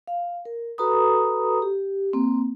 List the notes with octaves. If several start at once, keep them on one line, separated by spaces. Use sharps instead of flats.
F5
A#4
F#4 A4 B4 A#5 B5 D#6
G4
A#3 C4